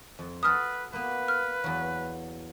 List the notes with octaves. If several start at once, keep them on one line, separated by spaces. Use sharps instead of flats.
F2
F#4 A4 B4 D#6 F6
A#3 B3 B4
F6
E2 F#3